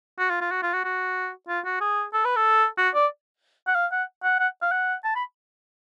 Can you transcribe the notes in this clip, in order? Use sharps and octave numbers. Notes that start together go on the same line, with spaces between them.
F#4
F4
F4
F#4
F4
F#4
F#4
F4
F#4
G#4
A4
B4
A4
F#4
D5
F#5
F5
F#5
F#5
F#5
F5
F#5
A5
B5